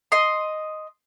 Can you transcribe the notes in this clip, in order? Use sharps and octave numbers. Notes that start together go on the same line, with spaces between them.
D#5 C6